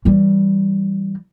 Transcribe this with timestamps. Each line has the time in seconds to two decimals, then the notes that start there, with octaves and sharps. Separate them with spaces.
0.05 E3 G3